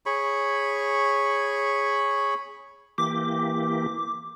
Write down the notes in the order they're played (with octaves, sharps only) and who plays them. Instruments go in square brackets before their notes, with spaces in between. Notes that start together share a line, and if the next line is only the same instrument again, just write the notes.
[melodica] G#4 C#5 B5 C#6
[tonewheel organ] E3 A#3 G4 [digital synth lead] D6